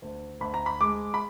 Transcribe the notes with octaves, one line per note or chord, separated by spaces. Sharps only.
D2
D2 B5
A#5
B5
G#3 D6
B5